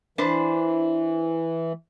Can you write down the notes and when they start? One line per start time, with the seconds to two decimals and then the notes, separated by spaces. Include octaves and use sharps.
0.18 E3 D4 B4 C5